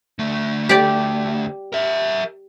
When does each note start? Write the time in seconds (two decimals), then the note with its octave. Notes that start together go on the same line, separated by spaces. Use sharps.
0.19 D2 A3
0.69 G4 D5
1.73 A#4 E5